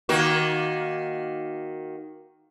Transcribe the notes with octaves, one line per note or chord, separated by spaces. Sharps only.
D#3 A#3 F#4